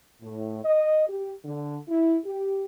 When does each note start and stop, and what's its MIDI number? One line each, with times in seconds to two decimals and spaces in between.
0.22 0.64 45
0.65 1.04 75
1.08 1.31 67
1.45 1.78 50
1.88 2.17 64
2.25 2.65 67